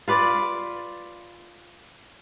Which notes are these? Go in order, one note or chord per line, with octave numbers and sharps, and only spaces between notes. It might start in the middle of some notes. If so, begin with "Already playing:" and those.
F4 B4 D5